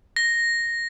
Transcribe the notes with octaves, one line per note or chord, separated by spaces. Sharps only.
A#6